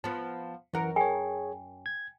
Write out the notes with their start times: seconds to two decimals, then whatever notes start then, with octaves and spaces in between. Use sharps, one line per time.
0.04 F3 B3 A5
0.73 F#2 E3 A#4 F#5
0.96 G#4 C#5 G5 G#5
1.86 G#6